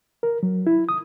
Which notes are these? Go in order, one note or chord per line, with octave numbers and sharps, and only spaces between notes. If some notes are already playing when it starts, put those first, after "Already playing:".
A#4
F#3
E4
D#6